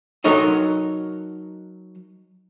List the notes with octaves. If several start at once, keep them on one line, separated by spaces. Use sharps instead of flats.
F#3 D#4 A4 A#4 C#5 D#5